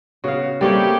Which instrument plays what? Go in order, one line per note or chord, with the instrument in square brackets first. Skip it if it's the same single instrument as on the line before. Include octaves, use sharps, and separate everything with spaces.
[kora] C#3 F5 [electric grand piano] B3 F#4
[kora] G3 A3 C#5 [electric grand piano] A#3 C4 G#4 [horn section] G4